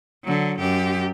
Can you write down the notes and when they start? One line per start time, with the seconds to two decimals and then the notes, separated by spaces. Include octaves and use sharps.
0.24 D3 F#3
0.60 F#2 G4